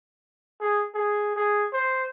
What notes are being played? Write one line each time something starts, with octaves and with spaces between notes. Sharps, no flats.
G#4
G#4
G#4
C5